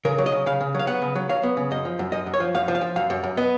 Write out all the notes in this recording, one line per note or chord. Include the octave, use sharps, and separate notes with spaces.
C#3 A#4
F#3
D#5
C#3
C#3 F5
C#3
F#3 F5
B3 F#5
C#3
F#3
F#3 F5
B3
C#3
F#2 D#5
F3
F#2
F#2 D#5
F#2
C#5
F3
F#2 F5
F3
F5
F3
F#2 F5
F#2
F#2
B3 D#5